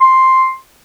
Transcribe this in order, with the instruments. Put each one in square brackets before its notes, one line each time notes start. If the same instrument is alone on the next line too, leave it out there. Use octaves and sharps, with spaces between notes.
[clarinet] C6